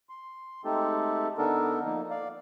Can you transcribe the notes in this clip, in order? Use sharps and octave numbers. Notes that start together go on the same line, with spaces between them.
C6
G#3 A3 C4 D#4 G4 A4
D3 B3 D4 D#4 A4 A#4
F3 A#3 D#4
D5 F5